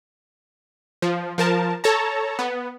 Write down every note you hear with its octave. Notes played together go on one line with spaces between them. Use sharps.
F3
F3 A#4 A5
A4 C#5 A5 A#5
B3